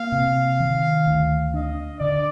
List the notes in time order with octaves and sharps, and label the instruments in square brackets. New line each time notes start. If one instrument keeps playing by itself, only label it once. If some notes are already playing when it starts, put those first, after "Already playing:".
Already playing: [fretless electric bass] A#3 [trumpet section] F5
[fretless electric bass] C3
D#3
D2
[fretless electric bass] D4 [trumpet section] D#5
[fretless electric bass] D3 [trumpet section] D5